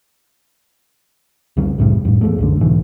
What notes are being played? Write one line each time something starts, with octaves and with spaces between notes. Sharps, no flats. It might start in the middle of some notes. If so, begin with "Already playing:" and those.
C2 F2 C#3 G3
C2 F#2 A2 G3
F2 A2
E2 G#3 A3
C2 F#2 D3
C2 G#2 B2 E3